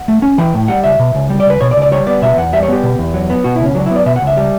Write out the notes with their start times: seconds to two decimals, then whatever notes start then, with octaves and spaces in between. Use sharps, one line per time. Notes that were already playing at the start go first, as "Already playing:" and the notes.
Already playing: F#5
0.08 A3
0.22 C#4
0.38 E3 G5
0.54 A2
0.68 G3 F#5
0.84 C#2 E5
0.99 B2
1.15 C#2
1.30 G3
1.40 D5
1.46 C#2 B4
1.61 B2 C#5
1.71 D5
1.76 C#2
1.82 D5
1.92 G3 C#5
2.07 B3 D5
2.22 B2 E5
2.37 E2 F#5
2.53 G3 E5
2.63 C#5
2.69 B3 G4
2.83 B2
2.99 E2
3.14 F#3
3.30 B3
3.44 B2 F#4
3.56 E4
3.60 C#2 C#4
3.75 F#3 D4
3.86 E4
3.91 B3 D5
4.06 B2 E5
4.16 F#5
4.22 C#2
4.27 E5
4.37 G3